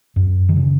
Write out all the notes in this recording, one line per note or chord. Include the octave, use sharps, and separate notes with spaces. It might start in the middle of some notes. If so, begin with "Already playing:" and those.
F#2
D#3
C#3